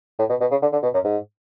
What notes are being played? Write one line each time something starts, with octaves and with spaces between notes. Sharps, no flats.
A2
B2
B2
C#3
D3
D3
B2
F#2
G#2